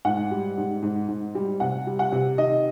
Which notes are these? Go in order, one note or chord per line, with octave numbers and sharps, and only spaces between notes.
G#2 F#5
G3
G#2
G#2
G#2
G3
C3 F#5
G3
F#5
C3
D#3 D#5